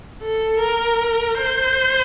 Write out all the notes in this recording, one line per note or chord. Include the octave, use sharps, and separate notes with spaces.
A4
A#4
C5